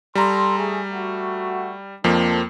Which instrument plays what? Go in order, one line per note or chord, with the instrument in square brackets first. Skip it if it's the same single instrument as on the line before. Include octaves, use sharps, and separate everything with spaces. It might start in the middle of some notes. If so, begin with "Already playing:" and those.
[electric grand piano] G3 A#5 [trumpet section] A4 C6
[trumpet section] A3 G#4
A3 F#4
[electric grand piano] F2 F3 A#3 [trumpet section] C4 D4 A4